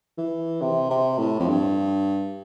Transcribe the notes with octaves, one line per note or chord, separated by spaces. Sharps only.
E3
C3
C3
A2
F2
G2